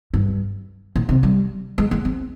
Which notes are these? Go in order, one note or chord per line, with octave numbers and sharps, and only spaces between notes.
G2
A#2
C3
G3
G#3
A#3
C4